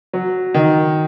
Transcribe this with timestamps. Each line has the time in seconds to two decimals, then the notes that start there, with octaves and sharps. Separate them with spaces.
0.13 F#3
0.54 D#3